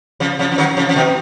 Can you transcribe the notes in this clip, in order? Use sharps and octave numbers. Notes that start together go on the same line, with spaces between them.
C#3 F3
C#3 F3
F3
D#3 F#3
C#3 F3
F3
B2 D#3